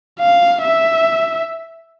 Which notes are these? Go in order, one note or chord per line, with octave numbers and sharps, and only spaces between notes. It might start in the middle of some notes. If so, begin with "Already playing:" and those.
F5
E5